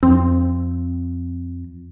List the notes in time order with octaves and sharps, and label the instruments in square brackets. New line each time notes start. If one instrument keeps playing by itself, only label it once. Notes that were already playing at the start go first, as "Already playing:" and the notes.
[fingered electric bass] F2 [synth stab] C4